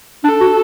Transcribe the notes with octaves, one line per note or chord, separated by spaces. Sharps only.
D4 A4
F#4